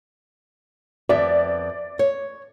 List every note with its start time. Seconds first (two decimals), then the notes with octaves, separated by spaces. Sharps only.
1.09 F2 B3 D5 E5
1.99 C#5